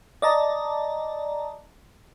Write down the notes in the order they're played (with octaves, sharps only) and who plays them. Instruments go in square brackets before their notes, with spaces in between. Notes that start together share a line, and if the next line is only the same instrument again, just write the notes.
[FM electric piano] D5 D#5 A5 A#5